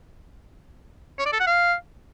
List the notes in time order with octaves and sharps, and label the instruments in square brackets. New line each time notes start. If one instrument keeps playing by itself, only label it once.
[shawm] C#5
D5
A4
F#5
F5